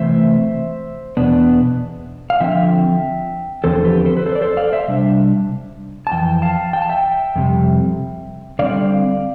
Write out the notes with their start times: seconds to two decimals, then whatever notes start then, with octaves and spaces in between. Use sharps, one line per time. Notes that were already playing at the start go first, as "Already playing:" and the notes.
Already playing: C3 E3 A3 C5 E5
1.17 E2 B2 B3 D4
2.30 F5
2.40 D3 F3 C4 E5 G5
3.64 E2 D3 F3 C4 A4 C5
3.85 G4 B4
4.05 A4 C5
4.17 B4
4.26 A4 C5
4.35 D5
4.42 A4 C5
4.57 D5 F5
4.72 C5 E5
4.88 C3 G3 D4
6.07 A5
6.12 F2 E3 G5
6.42 F5 A5
6.73 G5
6.82 A5
6.89 E5 G5
7.36 F2 C3 G3
8.59 D3 G3 C4 D5 F5